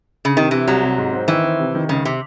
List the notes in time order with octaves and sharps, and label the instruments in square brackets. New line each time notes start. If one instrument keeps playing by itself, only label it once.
[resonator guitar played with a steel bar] C#3
[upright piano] C3 [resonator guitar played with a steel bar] D#3
[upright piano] C3 [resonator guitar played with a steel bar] E3
[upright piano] C2 [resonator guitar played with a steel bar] F#3
[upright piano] C3
G#2
C4
[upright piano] D#3 [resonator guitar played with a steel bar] E3
[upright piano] C4
C3
D#3
[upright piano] C#2 [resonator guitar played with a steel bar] C#3
[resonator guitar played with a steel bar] C3